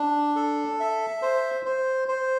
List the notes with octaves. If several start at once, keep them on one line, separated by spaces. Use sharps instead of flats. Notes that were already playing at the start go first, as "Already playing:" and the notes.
Already playing: D4
A4
E5
C5
C5
C5